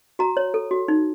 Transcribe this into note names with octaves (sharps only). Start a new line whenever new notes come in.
F#4 A#5
C#5
A4
F#4
D#4